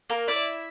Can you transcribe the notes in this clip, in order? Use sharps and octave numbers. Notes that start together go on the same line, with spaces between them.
A#3 A#4
E4 D5 E5